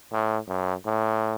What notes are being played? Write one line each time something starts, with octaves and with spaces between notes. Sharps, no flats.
A2
F#2
A2